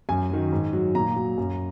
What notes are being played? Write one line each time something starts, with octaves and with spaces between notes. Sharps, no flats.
F#2 G#5
D#3 F#3
G#2
F#3
A#2 A#5
F#3
F#2